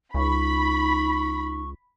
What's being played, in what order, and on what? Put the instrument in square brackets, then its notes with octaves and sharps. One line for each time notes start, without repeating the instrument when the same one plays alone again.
[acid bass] C#2 [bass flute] D#4 [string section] B5 [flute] C#6